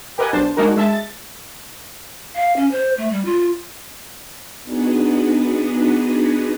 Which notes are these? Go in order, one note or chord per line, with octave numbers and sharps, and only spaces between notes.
G4 A#4 B4 D#5 F#5 G#5
B1 D4 C5 A5 C6
G#3 A#3 D4 D#4 F#4 A#4
G#3 E5 A5
A6
F5
C#4
C5
A3
G3
F4
B3 D4 D#4 F#4 G#4 B4